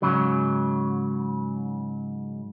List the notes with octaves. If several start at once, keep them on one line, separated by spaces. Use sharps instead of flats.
G#2 C#3 F#3